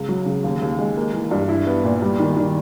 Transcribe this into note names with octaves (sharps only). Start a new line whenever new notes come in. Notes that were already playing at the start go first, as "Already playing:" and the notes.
Already playing: C#2
F#3
C#3
D#2
D#2
G#3
A#3
E3
G2
E4
B3
A#2
G3
D#3
D#3